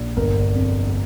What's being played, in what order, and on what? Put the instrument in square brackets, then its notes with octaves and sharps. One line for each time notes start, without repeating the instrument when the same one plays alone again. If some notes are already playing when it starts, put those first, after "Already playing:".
Already playing: [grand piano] A#1
G1 A#4
F2